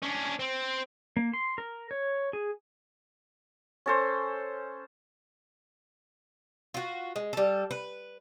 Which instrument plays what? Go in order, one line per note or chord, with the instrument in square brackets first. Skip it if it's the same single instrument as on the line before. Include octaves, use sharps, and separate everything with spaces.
[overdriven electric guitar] C#4 D4
C4
[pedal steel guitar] A#3
C6
A#4
C#5
G#4
[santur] C#4 A4 C5
[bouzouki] F4 F#4
G#3
G3 A4
B4